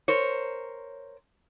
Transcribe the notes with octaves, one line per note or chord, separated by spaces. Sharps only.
A#4 C5 C#5